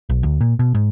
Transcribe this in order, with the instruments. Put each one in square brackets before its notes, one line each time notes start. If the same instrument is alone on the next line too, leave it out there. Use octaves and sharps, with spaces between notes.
[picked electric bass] B1
D2
A#2
B2
G#2